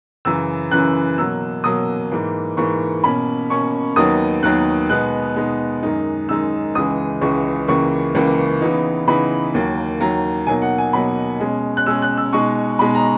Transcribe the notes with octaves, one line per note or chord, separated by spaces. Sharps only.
F#2 C#3 E3 E6
F#2 C#3 E3 F#6
B2 F#3 A#3 E6
B2 F#3 A#3 D#6
G#2 E3 A#3
G#2 E3 A#3 C#6
B2 A#3 C#4 B5
B2 A#3 C#4 C#6
D#2 D#3 F#3 B3 D#4 D#6
D#2 D#3 F#3 B3 D#4 F#6
B2 G#3 B3 D#4 F#6
B2 G#3 B3 D#4
F#2 D#3 G#3 D#4
F#2 D#3 G#3 D#4 E6
C#2 C#3 E3 G#3 D#6
C#2 C#3 E3 G#3 C#6
C#2 C#3 E3 A#3 C#6
C#2 C#3 E3 A#3
C#3 E3 B3 D#4
C#3 E3 B3 D#4 B5
D#2 D#3 F#3 A#3
D#2 D#3 F#3 A#3 A#5
B2 F#3 A#3 D#4 G#5
F#5
G#5
B2 F#3 A#3 D#4 B5
B2 G#3 C#4
F#6
B2 G#3 C#4 E6
F#6
E6
B2 G#3 D#4 C#6
B2 G#3 D#4 B5
A#5